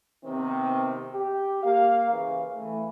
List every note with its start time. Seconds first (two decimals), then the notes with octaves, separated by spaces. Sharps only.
0.24 C3 D#3 B3 C4
1.11 G4
1.63 A#3 F5
2.10 C#3 E3
2.56 E3 A3